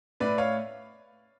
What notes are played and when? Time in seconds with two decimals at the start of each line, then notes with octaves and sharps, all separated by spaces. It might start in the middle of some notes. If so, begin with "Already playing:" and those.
0.20 A2 B4 D5
0.38 C#5 F5